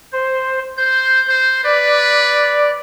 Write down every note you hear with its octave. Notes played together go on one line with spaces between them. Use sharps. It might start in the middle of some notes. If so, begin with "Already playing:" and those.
C5
C5 G6
C5
B4 D5